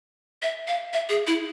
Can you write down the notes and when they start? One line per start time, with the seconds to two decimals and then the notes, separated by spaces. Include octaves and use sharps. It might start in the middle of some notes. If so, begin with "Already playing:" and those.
0.42 E5
0.68 F5
0.93 E5
1.09 G#4
1.27 E4